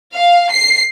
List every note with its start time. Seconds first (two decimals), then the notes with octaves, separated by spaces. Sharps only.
0.14 F5
0.51 C7